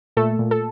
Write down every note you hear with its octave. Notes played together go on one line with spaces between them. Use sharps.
A#2 A3 A4
A#2
A4